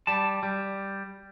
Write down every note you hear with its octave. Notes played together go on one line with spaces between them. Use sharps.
G3 A5
G3